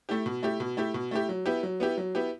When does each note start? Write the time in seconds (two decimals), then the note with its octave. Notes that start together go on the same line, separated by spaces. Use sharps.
0.09 A3 E4 G4
0.26 B2
0.43 A3 E4 G4
0.60 B2
0.77 A3 E4 G4
0.94 B2
1.11 A3 E4 G4
1.29 F#3
1.46 B3 E4 G4
1.63 F#3
1.80 B3 E4 G4
1.98 F#3
2.15 B3 E4 G4